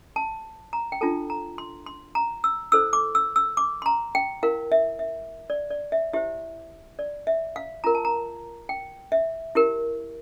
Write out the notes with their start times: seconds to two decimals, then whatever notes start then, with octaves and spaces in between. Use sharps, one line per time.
0.16 A5
0.73 A#5
0.92 G5
1.01 D4 F4 A4 A5
1.30 A#5
1.58 C6
1.86 C6
2.15 A#5
2.44 E6
2.72 E4 A4 C5 E6
2.93 D6
3.15 E6
3.36 E6
3.57 D6
3.82 C6
3.86 A#5
4.15 G5
4.43 E4 A#4 F5
4.72 E5
4.99 E5
5.50 D5
5.70 D5
5.92 E5
6.13 E4 G4 C5 E5
6.99 D5
7.27 E5
7.56 F5
7.84 F4 A#4 A#5
7.95 A5
8.05 A#5
8.69 G5
9.12 E5
9.55 E4 G4 A#4